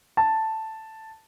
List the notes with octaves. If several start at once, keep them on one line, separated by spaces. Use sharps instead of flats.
A5